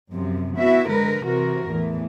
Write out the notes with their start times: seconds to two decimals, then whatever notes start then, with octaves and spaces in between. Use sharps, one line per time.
0.11 F#2 C3 F3
0.57 B3 E4 F#4 E5
0.90 D3 G#3 A#4 B4
1.25 C3 E3 F#4 A#4
1.69 E2 A2 E3